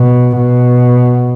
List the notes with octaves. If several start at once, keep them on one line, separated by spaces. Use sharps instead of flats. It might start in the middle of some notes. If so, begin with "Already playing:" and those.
Already playing: B2
B2